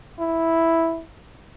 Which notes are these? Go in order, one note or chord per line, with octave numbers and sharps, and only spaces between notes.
E4